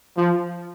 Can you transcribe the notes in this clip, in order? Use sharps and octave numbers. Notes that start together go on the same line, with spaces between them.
F3